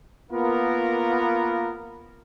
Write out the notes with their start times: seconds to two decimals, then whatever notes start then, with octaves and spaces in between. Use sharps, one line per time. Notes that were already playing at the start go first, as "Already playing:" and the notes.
0.32 A#3 B3 F4 A#4